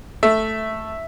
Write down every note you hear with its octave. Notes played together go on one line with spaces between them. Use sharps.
A3 E5